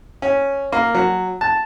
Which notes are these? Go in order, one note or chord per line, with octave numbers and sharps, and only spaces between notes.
C#4
A#3
F#3
A5